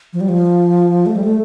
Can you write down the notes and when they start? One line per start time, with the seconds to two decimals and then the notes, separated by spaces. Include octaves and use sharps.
0.13 F3
0.21 G3
0.29 F3
1.06 A3
1.16 G3
1.24 A3